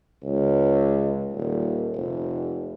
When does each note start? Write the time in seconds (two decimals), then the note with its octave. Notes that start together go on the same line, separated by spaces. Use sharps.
0.24 C#2
1.32 D#1
1.94 F1